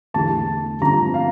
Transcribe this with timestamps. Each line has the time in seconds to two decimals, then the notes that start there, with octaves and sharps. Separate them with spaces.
0.14 E2 D3 A3 E4 G4 A5
0.81 G2 D3 F3 A3 C4 A#5
1.14 F5